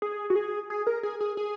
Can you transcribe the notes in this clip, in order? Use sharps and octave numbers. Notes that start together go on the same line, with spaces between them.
G#4
F#4
G#4
G#4
A#4
G#4
G#4
G#4